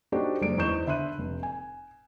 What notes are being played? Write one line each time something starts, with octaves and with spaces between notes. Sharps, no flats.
D4 D#4 F#4 G4 A4 C5
F#1 G#3 D5 D7
E2 D#4 C5 C#6 G6 E7
D3 E5 B5 C6 F#6 D#7
F1
G#5